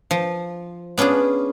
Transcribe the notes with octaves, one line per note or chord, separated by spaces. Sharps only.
F3
B3 C#4 D4 F4 G#4